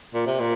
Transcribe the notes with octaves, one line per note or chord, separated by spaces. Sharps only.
A#2
C3
A#2